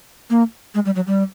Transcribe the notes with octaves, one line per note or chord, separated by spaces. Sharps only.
A#3
G#3
G3
F#3
G3